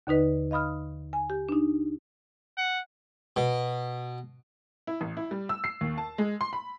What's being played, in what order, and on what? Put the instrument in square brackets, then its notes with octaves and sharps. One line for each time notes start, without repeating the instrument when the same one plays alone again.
[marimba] D#2 D3 D#4 B4 D#5
D#5 F5 B5 D#6 F6
G#5
G4
D4 D#4
[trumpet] F#5
[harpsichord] B2
[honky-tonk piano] E4
A1
E4
G3
E6
C7
D#2
A5
G#3
C6
B5